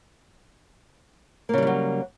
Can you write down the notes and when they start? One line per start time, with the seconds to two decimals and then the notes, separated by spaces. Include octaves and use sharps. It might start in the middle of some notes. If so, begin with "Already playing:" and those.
1.49 A#3
1.53 C#3
1.58 G3
1.62 E3
1.67 F#3